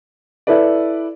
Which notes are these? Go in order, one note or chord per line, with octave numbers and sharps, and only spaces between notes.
E4 A4 B4 D5